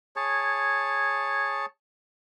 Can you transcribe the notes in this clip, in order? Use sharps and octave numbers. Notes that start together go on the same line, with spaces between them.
G#4 C#5 A5